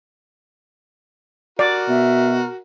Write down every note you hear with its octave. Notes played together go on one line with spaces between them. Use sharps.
F#4 A#4 D5
B2 E5